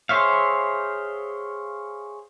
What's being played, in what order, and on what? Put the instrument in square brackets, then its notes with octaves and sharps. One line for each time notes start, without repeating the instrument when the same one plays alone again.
[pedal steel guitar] G#4 C5 C#5 E5 F5